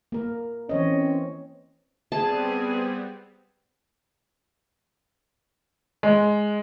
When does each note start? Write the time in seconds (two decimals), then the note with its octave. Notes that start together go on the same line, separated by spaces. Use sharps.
0.12 A#3 A#4
0.69 E3 C4 C#4 C#5 D#5
2.12 G3 B3 C4 G#4 A5
6.03 G#3